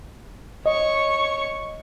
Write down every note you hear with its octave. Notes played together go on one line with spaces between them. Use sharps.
C#5 D#5 C#6